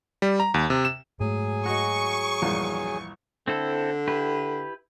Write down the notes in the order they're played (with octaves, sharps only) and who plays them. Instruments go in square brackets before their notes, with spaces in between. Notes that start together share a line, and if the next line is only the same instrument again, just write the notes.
[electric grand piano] G3
A#5
D#2
C3
E7
[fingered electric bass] G#2 A3 [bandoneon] F#3 G#4 G#5
[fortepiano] F#4 D#5 [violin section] C#6
[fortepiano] A#1 E2 G2
[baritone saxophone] D3 [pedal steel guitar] C4 E4 A4
[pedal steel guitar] E4 G4 B4